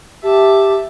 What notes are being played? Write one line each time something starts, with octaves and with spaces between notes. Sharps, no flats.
G4 E5 A5